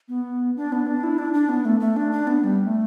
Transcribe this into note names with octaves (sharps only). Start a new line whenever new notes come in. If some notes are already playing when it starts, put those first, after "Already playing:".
B3
D4
B3
D4
E4
D4
D4
B3
A3
A3
D4
D4
B3
G3
A3